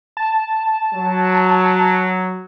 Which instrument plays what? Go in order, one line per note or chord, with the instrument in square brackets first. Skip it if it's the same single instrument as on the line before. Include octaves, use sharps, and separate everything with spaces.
[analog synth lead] A5
[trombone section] F#3